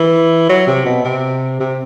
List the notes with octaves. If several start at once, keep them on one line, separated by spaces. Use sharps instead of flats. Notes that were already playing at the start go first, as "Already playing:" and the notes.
Already playing: E3
F#3
C3
B2
C3
C3